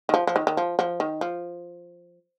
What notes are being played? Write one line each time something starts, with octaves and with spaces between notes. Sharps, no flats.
D#3
F3
F3
D#3
D#3
F3
F3
D#3
F3